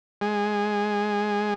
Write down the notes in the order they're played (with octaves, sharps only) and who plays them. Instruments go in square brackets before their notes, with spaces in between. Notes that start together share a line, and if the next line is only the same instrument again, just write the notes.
[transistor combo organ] G#3